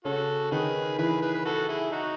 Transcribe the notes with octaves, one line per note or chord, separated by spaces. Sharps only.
C#3 C#4 F#4 A4
D#3 D#4 G#4 B4
E3 E4 G#4 B4
G#4 B4
B4
F#4 A4
E4 G#4
D#4 F#4